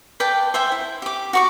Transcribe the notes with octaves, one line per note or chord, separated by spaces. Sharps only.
B4 D5 G5 A5
C5 E5 G5 G#5
E4
G4 D6
F#4 C#6 D6